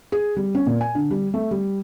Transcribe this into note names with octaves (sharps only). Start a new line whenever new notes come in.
G#4
G3
C#4
A#2
G#5
D3
G3
A3
G3